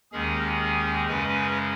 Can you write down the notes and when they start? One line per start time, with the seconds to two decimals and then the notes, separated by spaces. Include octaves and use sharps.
0.12 D#2 D#3 G#3 C#4 G#4
1.08 F#2 C#3 G#3 C#4 B4